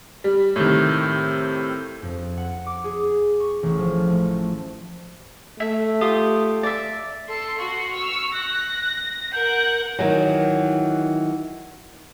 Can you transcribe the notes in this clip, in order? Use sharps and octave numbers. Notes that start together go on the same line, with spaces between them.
G3
A2 C3 D#3
F2
F#5
D6
G#4
C#6
A1
F3
A3
A3 E5
F4 G4 D#6
D5 E5
A4 C6 C#7
F#4 C6 C#6
E6 F6
F#6 A#6
A#4 F#5 G6
D#3 E3 F#3